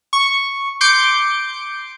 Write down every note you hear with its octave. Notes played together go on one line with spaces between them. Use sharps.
C#6
C6 D6 G6 C#7 D7